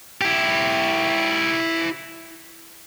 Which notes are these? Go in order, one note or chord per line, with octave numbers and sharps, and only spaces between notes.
E4 G4